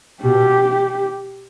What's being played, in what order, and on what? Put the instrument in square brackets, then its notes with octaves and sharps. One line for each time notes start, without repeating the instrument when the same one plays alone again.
[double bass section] B2 [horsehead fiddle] G4